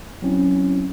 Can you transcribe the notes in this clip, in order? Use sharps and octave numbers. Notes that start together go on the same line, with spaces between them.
F#3 C4 C#4 E4